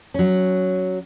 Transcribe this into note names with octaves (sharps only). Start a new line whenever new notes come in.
F#3 C#4